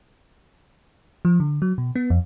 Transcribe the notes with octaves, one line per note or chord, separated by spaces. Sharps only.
F3
D3
F#3
B2
B3
F2